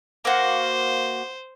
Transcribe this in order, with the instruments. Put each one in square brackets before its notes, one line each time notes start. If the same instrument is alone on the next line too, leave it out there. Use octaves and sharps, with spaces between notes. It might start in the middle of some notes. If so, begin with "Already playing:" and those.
[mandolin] A#3 F#4 [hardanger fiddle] C5